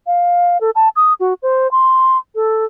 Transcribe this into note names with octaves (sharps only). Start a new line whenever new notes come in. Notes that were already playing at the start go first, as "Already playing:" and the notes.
F5
A4
A5
D#6
F#4
C5
C6
A4